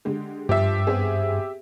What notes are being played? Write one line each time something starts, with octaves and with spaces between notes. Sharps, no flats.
D3 G#3 G4
G2 F3 G4 E5
B3 C4 G#4